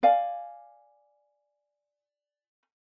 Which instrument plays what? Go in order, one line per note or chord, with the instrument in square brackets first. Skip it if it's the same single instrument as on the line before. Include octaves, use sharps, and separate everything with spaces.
[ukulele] D5 F5 G#5